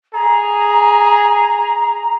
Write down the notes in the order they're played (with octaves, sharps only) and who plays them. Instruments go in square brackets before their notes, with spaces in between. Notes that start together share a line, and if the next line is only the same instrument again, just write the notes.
[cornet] G#4 [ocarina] A#5